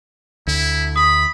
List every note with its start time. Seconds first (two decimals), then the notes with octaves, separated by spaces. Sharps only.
0.47 D2 E4
0.96 B5 D#6